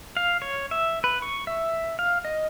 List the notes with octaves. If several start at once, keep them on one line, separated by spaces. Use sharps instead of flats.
F5
C#5
E5
B4
C#6
E5
F5
D#5